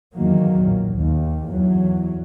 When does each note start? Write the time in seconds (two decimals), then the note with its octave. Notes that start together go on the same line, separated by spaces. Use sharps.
0.13 E2 D#3 F#3 A#3
0.61 A#1
0.93 D#2
1.50 E2 F#3